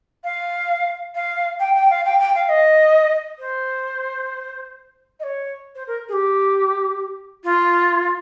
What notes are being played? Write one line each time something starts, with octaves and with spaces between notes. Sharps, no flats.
F5
F5
G5
G5
F5
G5
G5
F5
D#5
C5
D#5
C#5
C5
A#4
G#4
G4
F4